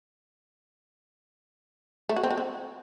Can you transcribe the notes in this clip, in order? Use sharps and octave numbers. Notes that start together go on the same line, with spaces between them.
A3
F#4
C4
F#4
C4